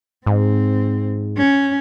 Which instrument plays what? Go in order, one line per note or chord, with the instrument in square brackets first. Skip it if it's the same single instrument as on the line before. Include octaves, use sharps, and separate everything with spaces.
[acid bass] G#2 [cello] C4
[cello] C#4